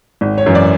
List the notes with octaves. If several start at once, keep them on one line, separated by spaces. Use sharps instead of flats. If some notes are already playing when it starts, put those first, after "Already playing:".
G#1
C#5
F#2 E3
D5